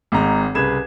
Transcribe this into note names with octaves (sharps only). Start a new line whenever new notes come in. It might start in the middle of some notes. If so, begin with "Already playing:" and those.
G#1 G#2 A#5
C2 C#3 B4 G#6 E7